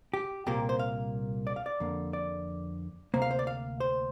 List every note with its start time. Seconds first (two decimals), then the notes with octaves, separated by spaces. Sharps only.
0.14 G4
0.46 C2 A#2 A#3 G4
0.69 C5
0.79 F5
1.47 D5
1.56 F5
1.66 D5
1.80 F2 D3 A#3
2.13 D5
3.14 D2 C3 A#3 C5
3.22 F5
3.31 C5
3.39 D5
3.47 F5
3.80 C5